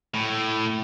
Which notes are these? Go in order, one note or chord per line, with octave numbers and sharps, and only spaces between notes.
A2